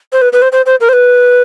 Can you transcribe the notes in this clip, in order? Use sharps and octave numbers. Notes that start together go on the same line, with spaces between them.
C5
B4
B4
C5
C5
C5
A#4
C5
B4